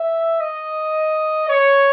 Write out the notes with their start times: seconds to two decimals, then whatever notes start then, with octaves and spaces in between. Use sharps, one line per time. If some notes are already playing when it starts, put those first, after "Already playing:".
Already playing: E5
0.40 D#5
1.49 C#5